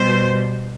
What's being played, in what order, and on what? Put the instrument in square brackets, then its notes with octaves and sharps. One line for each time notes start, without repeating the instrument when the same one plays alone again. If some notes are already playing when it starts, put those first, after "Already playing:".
Already playing: [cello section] B2 G3 C5